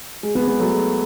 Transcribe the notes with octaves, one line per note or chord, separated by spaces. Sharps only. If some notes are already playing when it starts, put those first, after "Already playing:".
G#3
G#3 B3
G#3 B3
F#3 A3
G#3